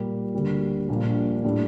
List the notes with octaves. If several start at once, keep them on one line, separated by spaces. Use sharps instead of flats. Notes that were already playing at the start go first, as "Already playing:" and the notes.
Already playing: A#2 G3 A#3
D2 D3 G3 A#3 F#4
A#1 A#2 G3 A#3 D4
A2 G3 D4